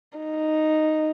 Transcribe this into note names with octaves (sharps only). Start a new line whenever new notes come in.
D#4